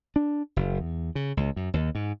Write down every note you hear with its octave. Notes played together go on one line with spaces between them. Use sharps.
D4
F#1
E2
C#3
C#2
F#2
D#2
G#2